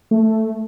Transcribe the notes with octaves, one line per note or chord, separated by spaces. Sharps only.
A3